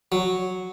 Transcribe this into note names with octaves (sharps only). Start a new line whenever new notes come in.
F#3